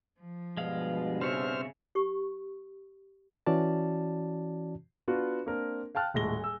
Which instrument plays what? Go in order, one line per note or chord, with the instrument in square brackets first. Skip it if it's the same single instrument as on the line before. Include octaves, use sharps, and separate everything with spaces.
[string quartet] F3
[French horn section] G2 B2 [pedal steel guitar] G#3 F5
[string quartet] C#3 [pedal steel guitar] C4 C#5 E5 [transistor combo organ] C5 F6
[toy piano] G4 C#6
[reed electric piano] E3 C#4 F#4 D5 A5
[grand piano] B3 D4 F4 F#4
A#3 C4 D4 A#4
F5 G5 A5 F6 F#6
D#1 A2 G#3 A#6 G7
G#4 E6